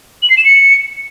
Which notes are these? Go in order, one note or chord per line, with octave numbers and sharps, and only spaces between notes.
F#7
C7
E7
C#7